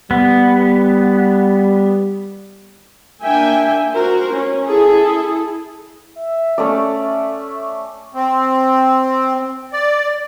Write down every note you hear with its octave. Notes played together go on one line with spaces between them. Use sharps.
G3 B3
A#3 D4 E5 G5 G#5
F#4 A#4 C5
C#4
E4 G#4 A4
E5
A3 C#4 D5
C4
D5